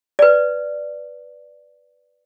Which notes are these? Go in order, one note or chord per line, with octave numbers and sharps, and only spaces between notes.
B4 D5